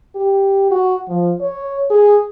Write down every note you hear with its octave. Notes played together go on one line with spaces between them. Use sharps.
G4
F#4
F3
C#5
G#4